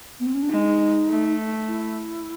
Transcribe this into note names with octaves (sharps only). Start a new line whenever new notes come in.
B3
C4
C#4
D4
G#3 D#4
A3
E4